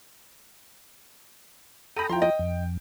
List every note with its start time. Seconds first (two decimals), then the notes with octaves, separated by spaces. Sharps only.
1.96 A4 G5 A#5 B5 D#6
2.09 F3 E4 F4 G5 A#5 C6
2.22 D#5 G5
2.39 F2